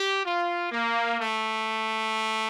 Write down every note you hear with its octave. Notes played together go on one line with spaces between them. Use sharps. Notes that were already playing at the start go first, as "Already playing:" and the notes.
Already playing: G4
F4
A#3
A3